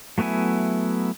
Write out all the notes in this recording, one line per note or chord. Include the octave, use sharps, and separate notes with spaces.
F#3 A3 B3 E4 G#5